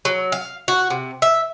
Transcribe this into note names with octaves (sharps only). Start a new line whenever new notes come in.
F#3
F5
F#4
C3
E5